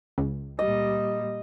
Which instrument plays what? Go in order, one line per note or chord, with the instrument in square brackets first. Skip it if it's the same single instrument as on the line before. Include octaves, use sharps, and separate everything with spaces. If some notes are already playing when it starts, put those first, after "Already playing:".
[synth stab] C#2
[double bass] A#2 G3 [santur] D#5